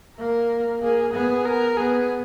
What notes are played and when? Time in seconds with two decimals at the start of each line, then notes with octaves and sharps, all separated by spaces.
0.18 A#3 A#4
0.82 A#3 G#4
1.13 B3 G#4
1.45 A#4
1.77 B3 G#4